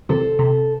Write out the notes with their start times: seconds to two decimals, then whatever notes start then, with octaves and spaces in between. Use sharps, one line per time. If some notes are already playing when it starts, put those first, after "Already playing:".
0.09 C3 A4 C5
0.39 C3